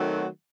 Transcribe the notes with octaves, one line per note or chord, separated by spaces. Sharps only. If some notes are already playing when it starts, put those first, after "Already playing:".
Already playing: D#3 F#3 A3 C4 F#4